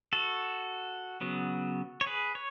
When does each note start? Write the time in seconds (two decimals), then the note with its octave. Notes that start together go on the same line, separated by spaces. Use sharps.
0.13 F#4 A4
1.21 C#3 F#3 B3
2.01 C#5
2.06 G#4 B4
2.35 C#5